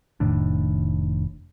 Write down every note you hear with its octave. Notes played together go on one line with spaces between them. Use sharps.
F1 A2 D#3 D4